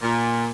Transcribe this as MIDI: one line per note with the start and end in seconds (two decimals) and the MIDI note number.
0.02 0.49 46